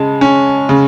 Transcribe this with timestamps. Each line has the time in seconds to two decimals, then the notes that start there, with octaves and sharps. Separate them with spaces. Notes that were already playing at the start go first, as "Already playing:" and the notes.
Already playing: C#3 G#3 A5
0.21 C#4
0.69 C#3